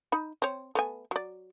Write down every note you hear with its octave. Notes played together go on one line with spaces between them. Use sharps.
D#4 B5
C4 C#5
A3 B3 G#5
F#3 D5